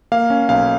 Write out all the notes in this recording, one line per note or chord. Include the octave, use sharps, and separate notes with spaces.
A#3 F5
C#4
B1 F5